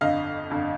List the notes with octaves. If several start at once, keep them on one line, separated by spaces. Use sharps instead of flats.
G1 F2 D3 D#5 F5
G1 F2 D3